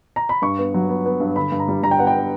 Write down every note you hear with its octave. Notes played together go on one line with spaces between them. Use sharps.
A#5
B5
G2 C#6
B3
F#3
B3
B3
G2
D3 B5
G2
A#5
G3
G3 A#5
G5
B3 F#5
G5
B3